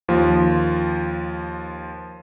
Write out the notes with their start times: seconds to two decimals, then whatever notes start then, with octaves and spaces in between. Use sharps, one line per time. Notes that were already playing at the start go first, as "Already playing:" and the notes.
0.09 D#2 F3